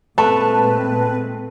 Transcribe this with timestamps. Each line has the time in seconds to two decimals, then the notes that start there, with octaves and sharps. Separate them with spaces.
0.18 A#2 G#3 A3 C4 B4 A5